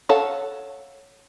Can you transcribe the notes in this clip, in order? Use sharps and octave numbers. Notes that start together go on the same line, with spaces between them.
A4 C#5 F5 F#5 A5